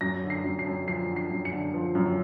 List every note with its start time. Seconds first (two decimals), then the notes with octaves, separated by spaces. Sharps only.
0.01 F#2 A#6
0.23 D3
0.30 C7
0.44 F#2
0.59 C7
0.66 F#2
0.88 F3 C7
1.09 D3
1.16 C7
1.31 F#2
1.45 C#7
1.52 D3
1.74 F3
1.95 F#2